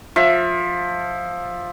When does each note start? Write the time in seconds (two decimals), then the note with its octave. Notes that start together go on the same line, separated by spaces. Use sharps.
0.16 F3 E5